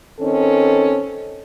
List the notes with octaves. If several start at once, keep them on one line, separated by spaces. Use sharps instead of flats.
D#3 C4 C#4 A4